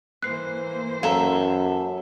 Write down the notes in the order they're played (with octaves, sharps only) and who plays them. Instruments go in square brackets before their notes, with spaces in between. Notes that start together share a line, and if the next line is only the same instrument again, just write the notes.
[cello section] E3 A#3 C5 [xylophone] F#6 C7
[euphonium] F#2 [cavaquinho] A4 E5 [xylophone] F5 A#5